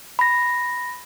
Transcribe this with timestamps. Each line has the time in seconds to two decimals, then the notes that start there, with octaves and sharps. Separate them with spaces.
0.19 B5 A#6